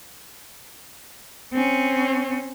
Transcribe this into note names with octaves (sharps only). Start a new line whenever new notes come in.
C4 C#4